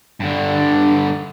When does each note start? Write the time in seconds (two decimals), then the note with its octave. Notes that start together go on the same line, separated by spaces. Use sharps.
0.20 G2 D3